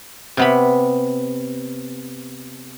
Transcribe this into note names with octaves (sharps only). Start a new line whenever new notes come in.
C3 B3 B5